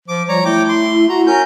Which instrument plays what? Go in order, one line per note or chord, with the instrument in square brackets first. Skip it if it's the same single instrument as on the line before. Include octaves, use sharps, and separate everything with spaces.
[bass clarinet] F3 [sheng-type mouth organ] D6
[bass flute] F3 [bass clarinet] G3 [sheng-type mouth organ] C#5 A#5
[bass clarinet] A3 [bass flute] E4 [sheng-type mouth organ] G5 D6
[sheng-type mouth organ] C6
[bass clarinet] F#4 [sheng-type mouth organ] A#5
[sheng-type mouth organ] C#4 A#4 G6